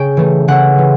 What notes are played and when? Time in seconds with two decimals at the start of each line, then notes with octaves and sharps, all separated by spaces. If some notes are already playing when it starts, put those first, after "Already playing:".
Already playing: C#3 G5
0.17 E3 A3
0.48 C#3 F#5
0.78 E3